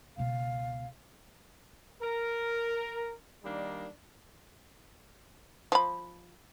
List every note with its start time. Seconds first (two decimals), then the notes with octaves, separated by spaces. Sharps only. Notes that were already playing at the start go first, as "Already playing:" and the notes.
0.17 C#2 B2 F5
2.01 A#4
3.44 D#3 G3 A#3 D4 D#4
5.72 F3 B5